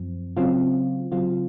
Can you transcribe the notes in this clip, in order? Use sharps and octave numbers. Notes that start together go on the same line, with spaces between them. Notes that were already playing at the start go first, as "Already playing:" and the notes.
Already playing: F#2 F3 C4
C#3 F#3 C4 F4
C#3 F#3 C4 F4